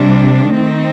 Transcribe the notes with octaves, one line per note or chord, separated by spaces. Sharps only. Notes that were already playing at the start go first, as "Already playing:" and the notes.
Already playing: C3 G3 D4
D#3 A3 C4 D#4